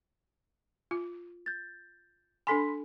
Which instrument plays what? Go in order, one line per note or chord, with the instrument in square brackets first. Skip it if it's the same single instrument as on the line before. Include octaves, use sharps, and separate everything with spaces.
[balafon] F4
[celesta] G6 A6
[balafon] D4 A4 G#5 [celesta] B5 C6 B6